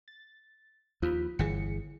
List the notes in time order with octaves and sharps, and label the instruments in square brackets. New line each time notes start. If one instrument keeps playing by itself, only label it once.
[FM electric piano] A6
[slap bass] D#2 [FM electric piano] F3 B5
[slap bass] G1 E3 [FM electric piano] G#4 C#7